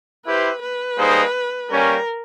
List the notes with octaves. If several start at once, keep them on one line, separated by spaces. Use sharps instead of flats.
E4 G4 B4 C5
B4
G3 A#3 D#4 G#4 C5
G3 A#3 C#4 A#4